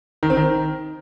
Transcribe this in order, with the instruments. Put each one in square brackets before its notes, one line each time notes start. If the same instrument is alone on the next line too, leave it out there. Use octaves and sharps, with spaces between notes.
[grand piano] D#3
C4
D#3